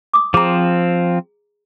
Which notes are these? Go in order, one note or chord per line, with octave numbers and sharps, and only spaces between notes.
D6 D#6
F3 C4 G#4 A#5